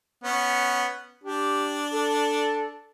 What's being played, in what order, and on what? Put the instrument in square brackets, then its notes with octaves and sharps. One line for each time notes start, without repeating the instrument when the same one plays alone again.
[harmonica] B3 C#4
[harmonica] D4 [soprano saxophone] G4
[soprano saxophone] A4